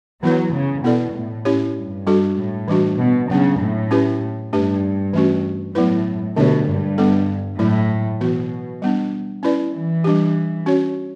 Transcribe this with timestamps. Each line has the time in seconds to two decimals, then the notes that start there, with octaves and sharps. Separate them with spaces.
0.22 E3 F#3 B3 E4 B4
0.54 C#3
0.84 B2 B3 E4 A4 D5
1.15 A2
1.45 C#4 E4 G4 C#5
1.76 G2
2.07 G3 D4 F#4 A4
2.37 A2
2.68 E3 G3 D4 F#4
2.99 B2
3.30 C#3 F#3 B3 D4
3.60 A2
3.91 C#4 E4 G4 B4
4.52 G2 A3 D4 G4 B4
5.13 E3 A3 C#4 F#4
5.75 A2 F#3 B3 E4 B4
6.36 B2 D3 A3 D4 G4 C#5
6.67 G2
6.98 G3 B3 D4 A4
7.59 A2 F#3 A3 E4
8.21 B2 E3 B3 F#4
8.82 G3 B3 D4
9.43 C#4 E4 B4 D5
9.74 E3
10.04 G3 D4 G4
10.66 C#4 F#4 C#5